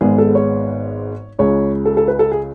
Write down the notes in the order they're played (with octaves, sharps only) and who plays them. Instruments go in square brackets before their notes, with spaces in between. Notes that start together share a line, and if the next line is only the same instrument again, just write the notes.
[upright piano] G#1 G#2 G#3 B3 G#4
A4
C#5
C#2 C#3 G#3 C#5
A4
A4
B4
A4
G#4